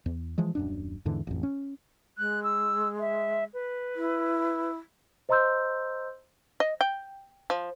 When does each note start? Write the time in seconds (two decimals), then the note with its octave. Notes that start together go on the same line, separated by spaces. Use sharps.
0.06 E2
0.38 E3 F3 G#3
0.55 D#1 F#2 D4
1.05 E2 G#2 D3 E3
1.27 A1 F2
1.43 C#4
2.18 G#3 F#6
2.43 E6
2.99 E5
3.54 B4
3.96 E4
5.29 C5 D#5 A#5 C6 E6 G6
6.60 D#5
6.81 G5
7.50 F3